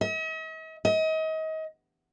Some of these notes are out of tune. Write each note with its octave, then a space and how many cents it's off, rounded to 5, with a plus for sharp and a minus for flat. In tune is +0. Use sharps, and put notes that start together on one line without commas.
D#5 +45
D#5 +30